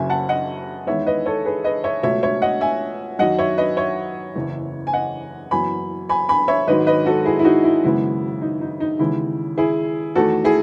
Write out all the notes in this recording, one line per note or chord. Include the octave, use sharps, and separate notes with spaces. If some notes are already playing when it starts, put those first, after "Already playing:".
Already playing: F#1 F#2 C#3 E5 G#5
F#5 A5
D#5 F#5
E2 D#3 G#3 B3 C#5 E5
B4 D#5
A4 C#5
G#4 B4
B4 D#5
C#5 E5
C#2 B2 F#3 A3 C#5 E5
C#5 E5
D#5 F#5
E5 G#5
F#2 D#3 F#3 D#5 F#5
C#5 E5
B4 D#5
C#5 E5
F#1 E2 C#3
G#5
D#5 F#5
F#1 F#2 E3 B3 G#5 B5
G#5 B5
G#5 B5
C#5 E5
G#1 G#2 D#3 F#3 B4 D#5
B4 D#5
F#4 A4
E4 G#4
E4
D#4 F#4
E4
G#1 F#2 C#3 G#3 B3 E4
D#4
D#4
D#4
D#2 C#3 E3 G#3 B3 E4
E4 G#4
E2 D#3 A3 F#4 A4
E4 G#4